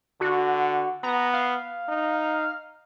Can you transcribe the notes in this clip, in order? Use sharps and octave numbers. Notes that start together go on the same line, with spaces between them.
D3 F#4
B3 A#5
F5
D#4